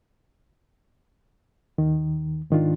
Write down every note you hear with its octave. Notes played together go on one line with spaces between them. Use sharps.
D#2 D#3
G#2 D#3 D4 F4